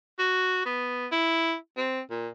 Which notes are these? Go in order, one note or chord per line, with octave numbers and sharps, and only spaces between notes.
F#4
B3
E4
C4
A#2